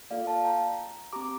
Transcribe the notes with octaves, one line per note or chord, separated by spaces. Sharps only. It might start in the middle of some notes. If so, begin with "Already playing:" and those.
A#3 F4 A4 D5 F5
F5 A5
G5 A#5
C4 G4 A#5 D6